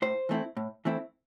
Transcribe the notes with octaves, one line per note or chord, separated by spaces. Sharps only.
A2 C5
E3 A3 C4 E4
A2
E3 A3 C4 E4